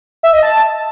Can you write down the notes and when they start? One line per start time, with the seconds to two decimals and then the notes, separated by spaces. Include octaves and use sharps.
0.23 E5
0.33 D#5
0.43 A5